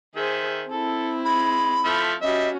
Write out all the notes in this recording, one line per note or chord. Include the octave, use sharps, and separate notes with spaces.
D#3 G#4 C5 E5
C4 E4 A4
G#3 B5
F3 A3 E5
G3 C#4 F#4 D#5 E5